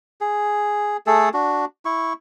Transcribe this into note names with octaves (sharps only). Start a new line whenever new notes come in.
G#4
A3 G#4 A4
D4 F#4
E4 C#6